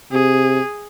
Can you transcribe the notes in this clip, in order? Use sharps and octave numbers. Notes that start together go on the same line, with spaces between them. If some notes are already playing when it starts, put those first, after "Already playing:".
C3 G#4